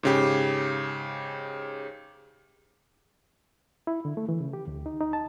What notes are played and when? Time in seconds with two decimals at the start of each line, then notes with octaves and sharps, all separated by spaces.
0.03 G#2 C#3 G4
3.87 E4
4.05 D3
4.17 A3
4.29 E3
4.40 C#3
4.53 G4
4.68 D2
4.86 D#4
5.01 D#4
5.13 A5